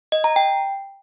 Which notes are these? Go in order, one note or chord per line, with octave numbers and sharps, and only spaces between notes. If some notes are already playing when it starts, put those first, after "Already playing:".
D#5
A#5
G5